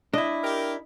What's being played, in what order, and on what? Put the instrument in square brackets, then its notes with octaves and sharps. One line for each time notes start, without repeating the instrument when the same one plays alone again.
[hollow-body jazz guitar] D4 E4 [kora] D#5
[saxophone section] G4 A#4